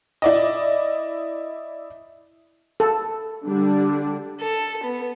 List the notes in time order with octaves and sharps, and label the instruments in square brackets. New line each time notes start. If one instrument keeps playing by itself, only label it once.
[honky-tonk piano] E4 D5 D#5
[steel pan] A4
[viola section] D3 G3 D4
[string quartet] A4
B3